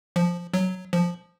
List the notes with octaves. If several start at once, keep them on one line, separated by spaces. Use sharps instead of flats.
F3
F#3
F3